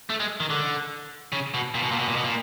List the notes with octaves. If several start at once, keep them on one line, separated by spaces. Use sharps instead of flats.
A3
G#3
D#3
D3
C#3
B2
A#2
B2
A#2
B2
A#2
B2
A#2